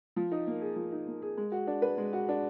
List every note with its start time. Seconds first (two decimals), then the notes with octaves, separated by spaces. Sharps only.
0.16 F3
0.32 D#4
0.47 A#3
0.61 G#4
0.76 F3
0.92 D#4
1.07 A#3
1.22 G#4
1.37 G#3
1.52 F#4
1.67 D4
1.82 B4
1.98 G#3
2.13 F#4
2.29 D4